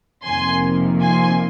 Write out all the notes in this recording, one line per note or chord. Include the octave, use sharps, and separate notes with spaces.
F2 C3 D#3 A#3 G#5 C6
G#5 C6